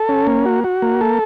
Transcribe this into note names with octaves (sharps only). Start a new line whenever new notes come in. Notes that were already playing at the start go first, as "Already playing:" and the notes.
Already playing: A4
C#4
A#3
F#4
F#4
A#3
A4